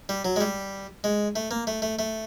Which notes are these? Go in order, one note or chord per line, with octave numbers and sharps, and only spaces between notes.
G3
F#3
G#3
G3
G#3
A3
A#3
A3
A3
A3